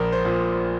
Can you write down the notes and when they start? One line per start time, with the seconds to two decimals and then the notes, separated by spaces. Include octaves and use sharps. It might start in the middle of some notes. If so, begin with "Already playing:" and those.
Already playing: A#1 A#4
0.12 C5
0.25 A#2